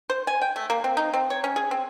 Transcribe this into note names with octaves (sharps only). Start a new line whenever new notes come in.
C5
G#5
G5
A3
A#3
C4
D#4
C4
C#5
C#4
G#4
C4